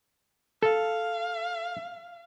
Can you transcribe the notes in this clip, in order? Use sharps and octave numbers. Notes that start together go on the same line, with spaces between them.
A4 F5